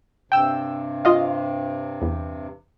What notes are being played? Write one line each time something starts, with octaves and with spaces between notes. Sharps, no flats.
G2 C3 G5 E6
F4 D#5 F5
E2